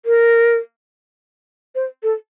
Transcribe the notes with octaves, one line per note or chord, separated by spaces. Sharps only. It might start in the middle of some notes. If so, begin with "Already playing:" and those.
A#4
C5
A4